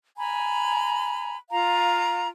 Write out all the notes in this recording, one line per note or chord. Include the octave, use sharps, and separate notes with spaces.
G#5 A#5 B5
F4 F5 A#5